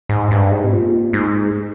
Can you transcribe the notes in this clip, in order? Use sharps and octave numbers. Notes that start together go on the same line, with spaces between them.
G#2
G2
G#2
C3
A#2
G#2